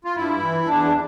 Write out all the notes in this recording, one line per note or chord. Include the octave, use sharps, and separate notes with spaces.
F4
G2 E4
E3
E2 D4